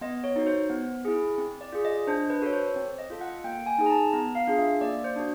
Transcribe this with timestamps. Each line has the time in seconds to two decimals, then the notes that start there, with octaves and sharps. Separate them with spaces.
0.01 B3 D#5
0.24 C#5
0.36 D#4 F#4
0.47 C5
0.70 B3
1.05 E4 G#4
1.38 C4
1.61 D5
1.72 F4 G#4
1.85 D#5
2.07 D4 C5
2.30 B4
2.42 F#4 A4 C#5
2.53 C5
2.76 C4
2.98 D#5
3.10 F4 A4
3.21 F#5
3.44 A#3 G5
3.66 G#5
3.78 D#4 G#4
3.86 A#5
3.90 A5
4.13 B3 A#5
4.35 F5
4.47 D4 F4 G#4
4.58 E5
4.81 A#3 D5
5.04 C5
5.16 D4 F#4